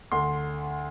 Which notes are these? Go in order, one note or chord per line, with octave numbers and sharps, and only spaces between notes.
D2 D3 C6